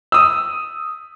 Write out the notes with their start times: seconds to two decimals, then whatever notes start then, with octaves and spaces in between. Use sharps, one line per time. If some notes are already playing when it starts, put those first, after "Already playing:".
0.12 D#6 E6